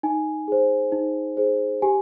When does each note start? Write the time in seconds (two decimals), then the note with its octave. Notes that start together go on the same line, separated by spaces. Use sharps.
0.03 D#4 G#5
0.48 G#4 C5
0.92 D#4
1.37 G#4 C5
1.82 G4 G#5